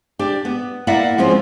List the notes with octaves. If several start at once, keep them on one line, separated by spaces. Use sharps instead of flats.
D4 G4
B3
A#3 E4 D5 E5 F#5
G#2 F3 G#3 C4 C#4